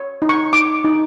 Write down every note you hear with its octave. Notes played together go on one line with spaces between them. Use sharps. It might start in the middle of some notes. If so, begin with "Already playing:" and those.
Already playing: C#5
D#4
C#6
D#4 D6
D#4